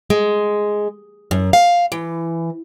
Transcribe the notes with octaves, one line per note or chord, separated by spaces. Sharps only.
G#3
F#2
F5
E3